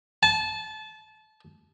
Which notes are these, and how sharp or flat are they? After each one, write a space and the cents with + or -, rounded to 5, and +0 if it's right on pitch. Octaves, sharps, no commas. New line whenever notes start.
A5 -25